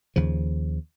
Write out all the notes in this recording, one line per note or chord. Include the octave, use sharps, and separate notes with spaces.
D#2 C#3 F3